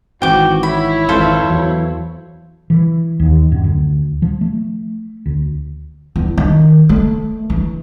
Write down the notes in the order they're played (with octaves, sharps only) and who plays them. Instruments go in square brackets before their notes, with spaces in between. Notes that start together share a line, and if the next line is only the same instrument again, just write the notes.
[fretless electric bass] G#1 E3 C4 [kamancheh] F#4 [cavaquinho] G5 D6
[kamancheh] E4 C#5 [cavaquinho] B5
[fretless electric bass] G#1 F2 E3 [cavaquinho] A4 C5 F5
[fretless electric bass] E2 E3 F#3
E3
D#2
F#2
D2
F3
A3
D2
[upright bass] E2
D#3
A3
E3